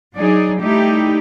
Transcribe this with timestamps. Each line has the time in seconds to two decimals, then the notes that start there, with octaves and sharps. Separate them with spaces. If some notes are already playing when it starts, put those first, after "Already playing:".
0.16 F#3 D4 D#4 G#4 D5
0.61 G3 A3 D#4 E4 G4